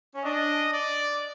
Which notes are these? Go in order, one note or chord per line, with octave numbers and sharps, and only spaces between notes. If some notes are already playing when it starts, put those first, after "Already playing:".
C#4
D4 D#5
D5